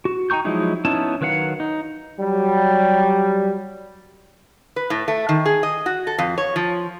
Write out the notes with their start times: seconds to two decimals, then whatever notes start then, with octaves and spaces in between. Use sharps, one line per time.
0.05 F#4
0.30 D#4 G5 A#5 C#6 G6
0.45 F3 F#3 G#3 D#4 E4
0.85 B3 C#4 D#4 E4 A5
1.21 D#3 F#3 B4 F5 F#5
1.60 D#4
2.19 F#3 G3
4.76 B4
4.90 A2
5.08 A3
5.29 D#3
5.46 G#4
5.63 D#5
5.86 F#4
6.07 A4
6.18 F2
6.38 C#5
6.56 F3